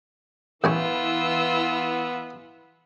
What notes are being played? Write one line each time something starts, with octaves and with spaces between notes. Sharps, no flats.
A1 E3 B3 F4 G#5 C#6 E6